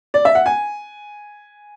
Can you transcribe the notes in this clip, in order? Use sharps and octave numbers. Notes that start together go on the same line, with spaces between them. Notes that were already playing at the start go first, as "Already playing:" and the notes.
D5
E5
F#5
G#5